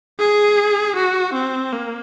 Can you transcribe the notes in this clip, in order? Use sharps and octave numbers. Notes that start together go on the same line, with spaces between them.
G#4
F#4
C4
A#3